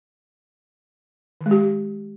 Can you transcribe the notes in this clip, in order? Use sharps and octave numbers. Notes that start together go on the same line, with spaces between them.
D#3
G#3
G4